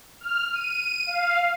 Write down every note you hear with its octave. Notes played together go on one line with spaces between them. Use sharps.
F6
D#7
F5